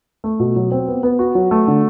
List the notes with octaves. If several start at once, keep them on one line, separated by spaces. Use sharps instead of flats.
A3
B2
F#3
C4
B3
B3
F#4
F#3
A3
D3